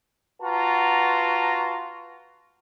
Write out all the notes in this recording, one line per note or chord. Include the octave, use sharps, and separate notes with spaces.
F4 F#4 B4 A5 A#5